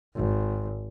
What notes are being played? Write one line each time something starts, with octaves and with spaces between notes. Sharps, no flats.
G#1